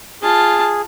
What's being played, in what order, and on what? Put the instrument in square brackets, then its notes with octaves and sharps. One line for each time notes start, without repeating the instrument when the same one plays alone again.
[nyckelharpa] F4 A5 [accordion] G#4